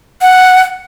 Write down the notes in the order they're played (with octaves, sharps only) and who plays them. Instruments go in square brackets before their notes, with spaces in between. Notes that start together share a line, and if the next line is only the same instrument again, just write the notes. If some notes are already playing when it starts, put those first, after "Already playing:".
[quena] F#5